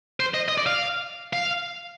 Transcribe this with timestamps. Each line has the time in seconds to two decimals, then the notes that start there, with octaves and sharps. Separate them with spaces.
0.20 C5
0.34 D#5
0.48 D#5
0.58 D5
0.66 F5
1.33 F5